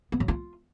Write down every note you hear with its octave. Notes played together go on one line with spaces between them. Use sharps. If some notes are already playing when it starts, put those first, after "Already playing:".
B3
F#3
F4